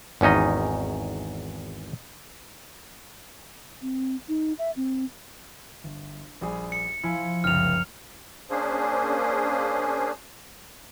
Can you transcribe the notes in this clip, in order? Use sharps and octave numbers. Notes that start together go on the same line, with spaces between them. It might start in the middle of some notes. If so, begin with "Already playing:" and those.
G#1 E2 C#4 D#4 D#5
C4
D#4
E5
C4
G1
A#1 G3 G#4
C#7
F3 E4 G#5
F1 C#2 F#2 F6 F7
A#3 C#4 D4 G#4 C5